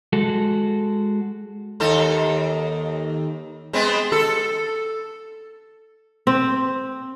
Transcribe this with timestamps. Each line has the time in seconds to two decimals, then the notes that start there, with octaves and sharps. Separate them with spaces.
0.13 G#3 F#4 A4
1.80 D#2 D#4 A4
3.73 G#3 B3 C4
4.12 A4
6.27 C4